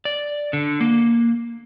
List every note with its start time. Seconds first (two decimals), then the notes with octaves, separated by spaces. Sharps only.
0.05 D5
0.53 D3
0.81 A#3